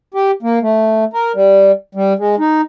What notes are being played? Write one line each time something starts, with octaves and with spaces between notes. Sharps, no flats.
G4
A#3
A3
A#4
G3
G3
G#3
D#4